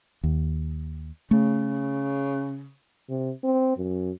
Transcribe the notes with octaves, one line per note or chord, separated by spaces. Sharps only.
D#2
C#3 A3
C3
C4
F#2